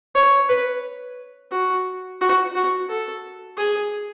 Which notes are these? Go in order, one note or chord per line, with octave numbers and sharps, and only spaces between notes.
C#5
B4
F#4
F#4
F#4
A4
G#4